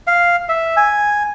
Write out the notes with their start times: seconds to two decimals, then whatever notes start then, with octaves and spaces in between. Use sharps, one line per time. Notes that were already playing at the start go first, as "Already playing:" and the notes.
0.07 F5
0.49 E5
0.77 G#5